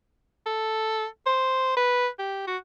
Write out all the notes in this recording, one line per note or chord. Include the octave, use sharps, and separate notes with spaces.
A4
C5
B4
G4
F#4